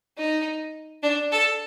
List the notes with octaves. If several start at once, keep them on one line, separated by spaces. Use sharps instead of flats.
D#4
D4
A4